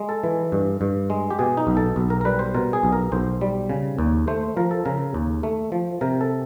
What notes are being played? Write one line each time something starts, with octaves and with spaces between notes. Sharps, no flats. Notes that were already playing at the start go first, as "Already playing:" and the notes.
Already playing: G#3
A4
E3
G2
G2
G#3
G4
B2 G#4
D#4
B1
A4
B1
A#4
A#4
G3 B4
C5
B2 A#4
G#4
B1
A#4
B1 C5
G3
C#3
D#2
A3 C5
F3 A#4
A4
C#3 A#4
D#2
A3
F3
C3 A#4
A4